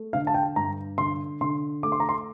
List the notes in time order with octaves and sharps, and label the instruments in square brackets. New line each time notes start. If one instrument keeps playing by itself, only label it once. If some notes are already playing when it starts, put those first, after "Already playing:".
Already playing: [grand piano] A3
D3 F5
A5
G5
G2 A#5
D3 C6
D3 C6
A3 D6
C6
A#5
C6